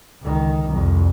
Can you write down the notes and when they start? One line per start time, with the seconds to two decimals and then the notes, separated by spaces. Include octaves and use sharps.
0.22 C#2 D#3
0.70 C2 F2